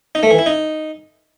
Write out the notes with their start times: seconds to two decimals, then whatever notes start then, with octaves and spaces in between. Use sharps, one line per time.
0.15 D#4
0.23 A3
0.31 E3
0.38 E4
0.46 D#4